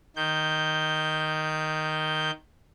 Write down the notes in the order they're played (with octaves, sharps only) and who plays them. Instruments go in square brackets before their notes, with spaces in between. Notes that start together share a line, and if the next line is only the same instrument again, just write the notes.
[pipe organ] D#3 G6